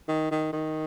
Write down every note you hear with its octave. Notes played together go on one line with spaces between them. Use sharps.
D#3
D#3
D#3